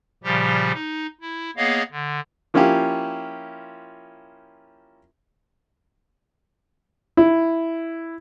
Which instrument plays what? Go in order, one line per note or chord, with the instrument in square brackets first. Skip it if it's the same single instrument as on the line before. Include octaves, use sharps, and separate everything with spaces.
[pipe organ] A#2 C#3 F3 G3 G4
D#4
E4
A#3 B3 G#4 C#5 D#5 F5
D3
[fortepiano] F3 A#3 C#4 E4 F4 G4
E4